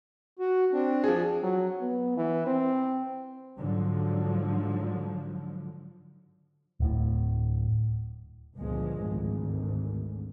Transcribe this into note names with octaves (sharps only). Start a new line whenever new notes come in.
F#4
C4 D4
F3 G#4
F#3
B3
E3
C4
G#2 D3 F3 F#3
D1 A2
G1 C#2 A#2 F3 G#3
G#1 D2